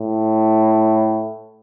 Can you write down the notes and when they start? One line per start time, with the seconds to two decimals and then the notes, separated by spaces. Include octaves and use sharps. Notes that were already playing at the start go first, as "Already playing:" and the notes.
Already playing: A2